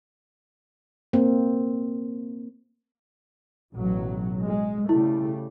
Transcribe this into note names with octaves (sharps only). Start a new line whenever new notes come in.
A#3 C4
A1 B2 F#3
G#3
C#3 G3 A3 E4